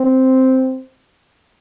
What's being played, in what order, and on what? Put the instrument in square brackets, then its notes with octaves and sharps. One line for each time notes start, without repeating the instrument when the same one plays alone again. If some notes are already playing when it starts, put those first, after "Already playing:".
Already playing: [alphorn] C4